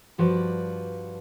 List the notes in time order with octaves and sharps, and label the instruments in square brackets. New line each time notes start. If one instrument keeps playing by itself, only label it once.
[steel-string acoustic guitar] G2 F3 F#4 B4 D5